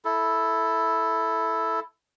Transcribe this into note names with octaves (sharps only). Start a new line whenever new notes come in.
E4 A4